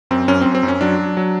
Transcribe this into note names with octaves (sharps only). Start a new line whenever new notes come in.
F#2 C4
F#2 C#4
C4
F#2
C4
F#2
C#4
F#3 D4
F#3
F#3